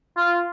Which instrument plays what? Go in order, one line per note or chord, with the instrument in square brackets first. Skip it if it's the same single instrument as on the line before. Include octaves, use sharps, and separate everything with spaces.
[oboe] F4